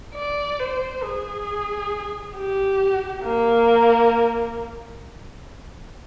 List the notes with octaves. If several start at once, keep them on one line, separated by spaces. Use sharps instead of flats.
D5
C5
G#4
G4
A#3